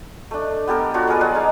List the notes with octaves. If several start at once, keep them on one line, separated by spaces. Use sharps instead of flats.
A3 D4
B3 G4 A4 A#4
D4 F4 F#4 C#5
D4 G#4 A#4 B4
F#3 G3 G#4 F#5
D#4 G#4 F5